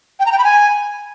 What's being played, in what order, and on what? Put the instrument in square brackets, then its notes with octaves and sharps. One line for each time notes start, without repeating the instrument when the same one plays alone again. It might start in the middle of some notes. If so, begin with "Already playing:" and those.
[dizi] G5
A#5
G5
B5
G#5